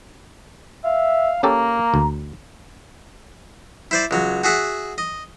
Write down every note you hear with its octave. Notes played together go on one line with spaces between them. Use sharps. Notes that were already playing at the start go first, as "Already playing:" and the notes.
E5 F5
A#3 C#4 G4 A4 A#5
D2
E4 C5 D5
C#2 F#3
F#4 G#4 E5 F#5
D#5